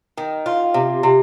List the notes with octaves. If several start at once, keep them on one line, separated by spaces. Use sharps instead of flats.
D#3
F4
C3
C3